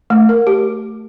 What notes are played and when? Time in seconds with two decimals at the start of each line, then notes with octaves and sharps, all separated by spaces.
0.10 A3
0.29 A#4
0.47 G4